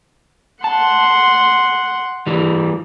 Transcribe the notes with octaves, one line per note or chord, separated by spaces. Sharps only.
F#5 A5 C6
E3 G3